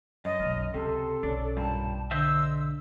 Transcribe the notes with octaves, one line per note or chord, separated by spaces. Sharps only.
F#2 D#5 A6
B1 A#3 F6
C#2 C3 A4 C6
B1 C#4 D4
G2 A#2 G5 A5
D3 C5 D#5 E5 E6